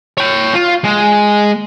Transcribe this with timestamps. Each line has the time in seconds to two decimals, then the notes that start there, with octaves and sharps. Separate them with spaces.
0.18 C#5 G5
0.54 F4
0.84 G#3